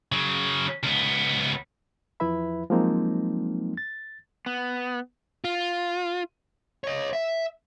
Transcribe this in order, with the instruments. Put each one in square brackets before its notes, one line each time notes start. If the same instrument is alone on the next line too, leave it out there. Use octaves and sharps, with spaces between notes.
[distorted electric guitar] C#3 F#3
C#2 B3
[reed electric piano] E2 F3 E4 B4 E5 B5
F3 F#3 G#3 A#3 C4 D#4
A6
[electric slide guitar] B3
[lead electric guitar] F4
C#5 D#5
E5